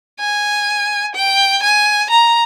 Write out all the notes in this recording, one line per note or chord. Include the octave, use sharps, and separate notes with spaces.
G#5
G5
G#5
A#5